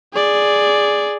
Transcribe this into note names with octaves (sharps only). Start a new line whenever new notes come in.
G#4 D5